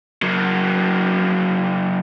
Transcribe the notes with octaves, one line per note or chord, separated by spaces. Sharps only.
F#3 A#3